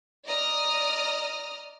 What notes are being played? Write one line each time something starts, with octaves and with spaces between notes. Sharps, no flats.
D5 D#5 A#5 D#6 F6